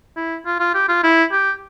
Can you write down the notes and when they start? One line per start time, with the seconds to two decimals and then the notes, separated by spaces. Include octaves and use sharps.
0.16 E4
0.46 F4
0.60 F4
0.74 G4
0.89 F4
1.04 E4
1.32 G4